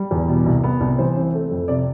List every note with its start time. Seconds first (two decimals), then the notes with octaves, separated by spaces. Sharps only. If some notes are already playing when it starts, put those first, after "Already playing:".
Already playing: G3
0.11 E2
0.28 B2
0.46 C2
0.64 B3
0.80 C2
0.98 E3 C5
1.17 C4
1.34 A3
1.51 F2
1.68 C3 D5